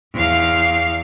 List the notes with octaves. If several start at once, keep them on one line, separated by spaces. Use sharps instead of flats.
E2 F5